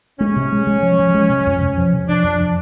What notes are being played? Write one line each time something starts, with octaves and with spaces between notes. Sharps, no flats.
G#3 C#4
C3
G#3
G#3
F3
F3
G#3
C3
F2
C3
F3
C3
F3 D4
F2
F3